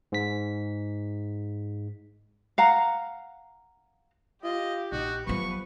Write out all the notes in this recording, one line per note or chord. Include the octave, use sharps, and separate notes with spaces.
G#2 B6
F5 F#5 A#5
F4 G4 D#5
A#1 D#4 F#4
F3 F#3 B3 B4 C#6